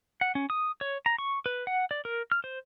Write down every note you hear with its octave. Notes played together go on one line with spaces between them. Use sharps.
F#5
C#4
D#6
C#5
A#5
C#6
B4
F#5
D5
A#4
F6
C5